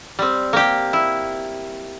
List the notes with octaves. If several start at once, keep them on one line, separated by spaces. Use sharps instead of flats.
G3 C4
A#3 G4
E4